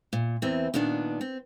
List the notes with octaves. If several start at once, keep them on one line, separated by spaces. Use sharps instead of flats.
A#2
E2 E3 C4
A#2 D#3 B3 D4
C4